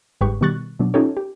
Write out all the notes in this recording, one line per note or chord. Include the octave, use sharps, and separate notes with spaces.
G1 G#2 G4 B4 C#6
B2 D#3 G3 C#6 F#6 A6
B2 F#3 D4
C#4 D#4 F4 G4 A4 C#5
G4